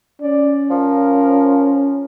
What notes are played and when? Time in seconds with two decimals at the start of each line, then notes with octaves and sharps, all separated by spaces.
0.21 C#4 D5
0.70 F3 A#4